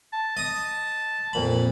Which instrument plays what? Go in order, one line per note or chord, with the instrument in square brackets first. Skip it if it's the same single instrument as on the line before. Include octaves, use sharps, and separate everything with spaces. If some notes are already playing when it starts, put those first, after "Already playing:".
[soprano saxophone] A5
[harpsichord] D#5 D#6
F2 A#2 B5